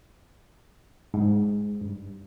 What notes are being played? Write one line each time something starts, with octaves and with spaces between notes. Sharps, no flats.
G#2
G2